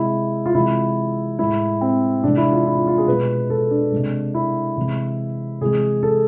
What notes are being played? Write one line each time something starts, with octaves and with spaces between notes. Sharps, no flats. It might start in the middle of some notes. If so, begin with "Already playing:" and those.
Already playing: C3 G#3 E4
F4
C3 E3 G#3 E4
A2 G#3 E4
C4
C3 E3 G#3 D4
E4
F4
E4
F4
F4
G#4
B2 G#3 B4
A4
D4
C3 G#3
E4
C3 E3 G#3
C3 E3 G#3 G#4
A4